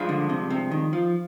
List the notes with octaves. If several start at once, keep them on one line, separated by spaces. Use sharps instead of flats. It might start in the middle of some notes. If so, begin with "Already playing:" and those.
Already playing: G2 F3 G#3 D4
D3
C3
C3
D#3
F3